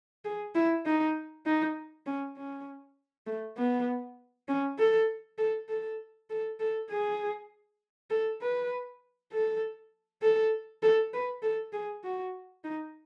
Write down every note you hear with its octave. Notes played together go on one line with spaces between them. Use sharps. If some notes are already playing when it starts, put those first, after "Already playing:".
G#4
E4
D#4
D#4
C#4
C#4
A3
B3
C#4
A4
A4
A4
A4
A4
G#4
A4
B4
A4
A4
A4
B4
A4
G#4
F#4
D#4